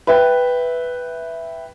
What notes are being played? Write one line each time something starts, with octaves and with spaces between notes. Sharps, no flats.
B4 E5 G5